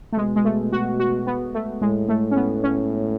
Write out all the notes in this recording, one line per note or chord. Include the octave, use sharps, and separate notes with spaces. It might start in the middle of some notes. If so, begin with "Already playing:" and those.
A3
B2 G#3
G#3
A3
F#4
F#4
B3
A3
A2 G#3
A3
C#4
B3
C#4